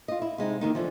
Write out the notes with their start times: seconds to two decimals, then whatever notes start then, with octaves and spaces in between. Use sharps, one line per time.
0.08 F4 D#5
0.22 E4
0.38 C3 G#3 D#4 E4
0.61 D#2 D#3 D#4
0.75 D3 E3 F3